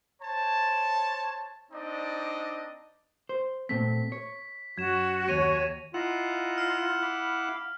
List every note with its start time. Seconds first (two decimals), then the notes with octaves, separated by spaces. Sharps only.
0.22 C5 C#5 A5
1.71 C4 D4 D#4 D5 D#5
3.29 C5
3.69 A#2 A3 C4 B6
4.12 C#5
4.78 F#2 F#4 G#6 E7
5.27 D#2 C#5 A#6 D#7 F7
5.94 E4 F4 D#5 F5 F#5 A#5
6.58 F6
7.02 F5 B5 D6